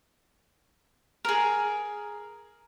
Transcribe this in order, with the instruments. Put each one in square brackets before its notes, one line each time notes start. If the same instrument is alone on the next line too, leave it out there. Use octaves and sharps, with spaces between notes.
[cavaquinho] G#4 A#4